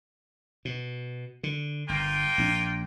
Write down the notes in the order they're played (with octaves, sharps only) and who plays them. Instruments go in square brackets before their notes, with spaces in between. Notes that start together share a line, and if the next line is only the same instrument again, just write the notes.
[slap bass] B2
D3
[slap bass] G1 [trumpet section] A#3 F4 G5
[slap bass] A#1 C#4 D4